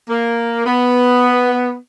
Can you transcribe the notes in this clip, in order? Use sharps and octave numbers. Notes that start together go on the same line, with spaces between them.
A#3
B3